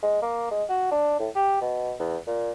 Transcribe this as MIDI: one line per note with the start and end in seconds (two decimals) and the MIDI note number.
0.03 0.22 56
0.22 0.51 58
0.51 0.64 56
0.69 0.90 66
0.91 1.16 62
1.20 1.29 45
1.35 1.57 67
1.62 1.94 47
2.00 2.18 40
2.27 2.51 46